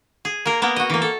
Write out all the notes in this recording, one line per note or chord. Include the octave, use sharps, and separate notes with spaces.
G#4
A#3 A#4
A#3 B3 A#4
F#4 D#5
E3 A#3
A4